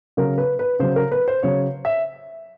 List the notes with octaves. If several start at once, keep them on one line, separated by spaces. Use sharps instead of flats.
C#3 F#3 A#4
B4
B4
C#3 F#3 C5
A#4
B4
C5
C#3 F#3 C#5
E5